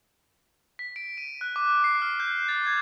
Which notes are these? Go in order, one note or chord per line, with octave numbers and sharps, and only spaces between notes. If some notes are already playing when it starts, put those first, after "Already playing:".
B6
D7
D#7
F#6
D6
C7
F6
G6
A6
G#6